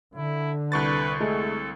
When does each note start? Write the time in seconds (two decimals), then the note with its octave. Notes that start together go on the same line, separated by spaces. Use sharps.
0.15 D3 E4
0.72 C2 B4 C#6 A6
1.20 G#3 A3 A4